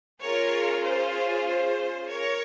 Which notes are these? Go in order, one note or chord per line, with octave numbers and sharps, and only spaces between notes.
C#4 F4 G#4 A#4 C#5
C5
C5
A#4 C#5